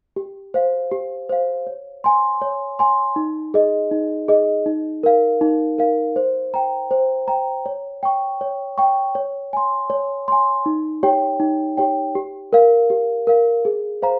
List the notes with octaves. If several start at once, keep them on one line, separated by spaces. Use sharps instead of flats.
G4
C5 F5
G4
C5 F5
C#5
G#5 C6
C#5
G#5 C6
D#4
G#4 D#5
D#4
G#4 D#5
D#4
A#4 F5
D#4
A#4 F5
C5
G5 A#5
C5
G5 A#5
C#5
G5 C#6
C#5
G5 C#6
C#5
G#5 C6
C#5
G#5 C6
D#4
G4 C#5 G5
D#4
G4 C#5 G5
G4
A#4 F5
G4
A#4 F5
G#4
C5 F5 A#5